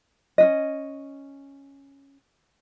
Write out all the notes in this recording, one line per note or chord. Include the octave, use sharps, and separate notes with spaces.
C#4 D4 D#5